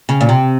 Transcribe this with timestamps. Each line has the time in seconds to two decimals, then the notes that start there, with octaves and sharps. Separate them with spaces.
0.09 C#3
0.21 A#2
0.29 C3